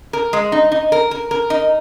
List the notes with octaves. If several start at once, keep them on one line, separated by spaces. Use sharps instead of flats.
A#4
G#3
D#4
D#4
A#4
A#4
A#4
D#4